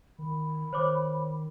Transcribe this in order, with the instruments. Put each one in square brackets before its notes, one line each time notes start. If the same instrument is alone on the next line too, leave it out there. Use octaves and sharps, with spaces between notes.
[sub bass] D#3 [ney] B5
[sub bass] D#3 [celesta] C5 C#5 D6